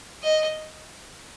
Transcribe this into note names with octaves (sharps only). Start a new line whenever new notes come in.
D#5